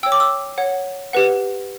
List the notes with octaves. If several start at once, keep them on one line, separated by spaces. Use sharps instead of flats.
C#5 G5 E6
D6
E6
C#5 F#5
G4 B4 F#5